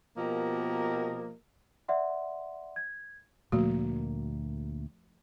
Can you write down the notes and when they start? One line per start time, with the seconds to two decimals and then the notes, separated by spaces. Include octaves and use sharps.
0.17 B2 F3 A#3 G4 A#4 D#5
1.88 D5 E5 F#5 C6
2.76 G#6
3.52 D2 A#2 F3 A3 A#3 F#4